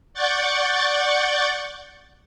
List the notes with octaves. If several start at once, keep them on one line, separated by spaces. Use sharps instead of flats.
D5 F#5 C#6 G6 A6